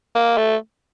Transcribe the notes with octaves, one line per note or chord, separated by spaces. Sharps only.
A#3
A3